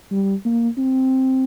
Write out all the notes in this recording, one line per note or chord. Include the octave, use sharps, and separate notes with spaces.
G3
A#3
C4